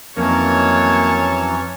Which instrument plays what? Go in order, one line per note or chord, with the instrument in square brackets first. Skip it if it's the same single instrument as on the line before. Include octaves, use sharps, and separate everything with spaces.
[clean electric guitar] F2 [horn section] D#3 A#3 [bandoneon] E3 F#3 C#4 [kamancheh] C#5 A5